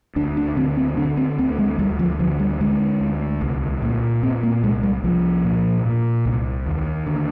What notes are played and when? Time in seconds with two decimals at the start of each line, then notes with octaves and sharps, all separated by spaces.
0.16 D2 D4
0.37 D4
0.56 D3 C4
0.77 C4
0.97 D3 D4
1.17 C4
1.38 D2 C4
1.59 G#3
1.79 D2 G3
1.99 F3
2.19 D3 F3
2.39 G3
2.60 D3 G#3
3.01 D2
3.41 C2
3.82 A#2
4.23 A#2 C4
4.43 A#3
4.63 C2 G#3
4.83 G3
5.04 C2 F3
5.44 A#2
5.85 A#2
6.25 C2
6.66 D#2
7.07 D3